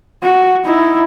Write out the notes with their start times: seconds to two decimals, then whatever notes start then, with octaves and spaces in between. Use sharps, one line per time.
0.23 F#4
0.65 D#4 E4